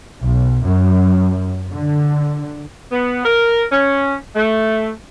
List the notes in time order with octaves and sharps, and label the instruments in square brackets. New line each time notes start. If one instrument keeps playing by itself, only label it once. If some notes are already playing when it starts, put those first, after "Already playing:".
[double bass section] B1
F#2
D3
[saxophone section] B3
A#4
C#4
A3